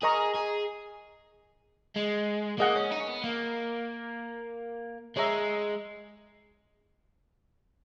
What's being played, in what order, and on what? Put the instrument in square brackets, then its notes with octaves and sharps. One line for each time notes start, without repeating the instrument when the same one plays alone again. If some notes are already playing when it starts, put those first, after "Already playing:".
[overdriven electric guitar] G#4 [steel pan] A#4 D#5 A#5 C#6
[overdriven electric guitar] G#4
G#3
[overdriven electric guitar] A#3 [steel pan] G#4 D#5 F#5
[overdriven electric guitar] C#4
D#4
C#4
B3
A#3
[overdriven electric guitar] G#3 [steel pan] G#4 C#5 E5 A#5